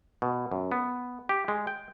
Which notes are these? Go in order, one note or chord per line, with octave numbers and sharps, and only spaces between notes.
B2
F#2
B3
G4
G#3
G5